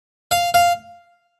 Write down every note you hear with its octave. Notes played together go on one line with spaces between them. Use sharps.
F5
F5